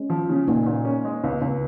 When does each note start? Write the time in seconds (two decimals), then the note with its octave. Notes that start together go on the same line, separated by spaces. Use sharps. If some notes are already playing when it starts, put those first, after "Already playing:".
Already playing: G#3 C#4
0.10 F3
0.29 C#3
0.48 A#2 A#3 D#4
0.66 A#2
0.85 C#4
1.05 G#3
1.24 C#2
1.42 C#2